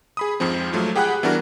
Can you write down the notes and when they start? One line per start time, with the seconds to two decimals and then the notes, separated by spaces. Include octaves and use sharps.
0.17 G#4 B5 D#6
0.40 F2 G#2 F3 C4
0.73 G#2 F3 F#3 A3
0.95 G4 G#4 F#5 G5 B5 F#6
1.23 E3 G3 B3 D4 F#4 A#4